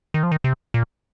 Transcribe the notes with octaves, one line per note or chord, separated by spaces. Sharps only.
D#3
F3
D#3
C3
A#2